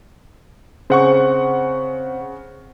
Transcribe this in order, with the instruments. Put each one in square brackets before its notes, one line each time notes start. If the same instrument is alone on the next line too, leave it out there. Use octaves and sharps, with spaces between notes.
[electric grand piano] C#3 F#5 C#6 [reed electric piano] C4 G#4 C5